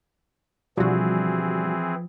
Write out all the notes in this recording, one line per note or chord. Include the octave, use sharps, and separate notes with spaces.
B2 D3 E3 F3 G3 C4 F#4 G#4